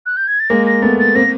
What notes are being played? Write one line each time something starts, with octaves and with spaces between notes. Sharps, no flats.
F#6
G6
G#6
A6
G#3 A#3 A#6
A#6
A3 B3 A6
A6
A#3 C4 A#6